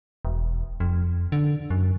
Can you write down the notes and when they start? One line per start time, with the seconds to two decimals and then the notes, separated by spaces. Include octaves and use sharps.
0.25 E1
0.80 F2
1.32 D3
1.70 F#2